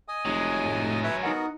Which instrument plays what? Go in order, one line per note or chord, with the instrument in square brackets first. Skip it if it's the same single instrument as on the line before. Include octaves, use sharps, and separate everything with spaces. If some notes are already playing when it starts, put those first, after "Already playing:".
[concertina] D#5 G#5 D#6
[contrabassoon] F1 [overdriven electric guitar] F#3 G#3
[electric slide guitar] A2
[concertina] B4 C#5 E5
[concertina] B3 F#4 A#4 [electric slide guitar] D#4 D#5 F#5